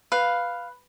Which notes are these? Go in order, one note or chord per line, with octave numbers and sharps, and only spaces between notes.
B4 F5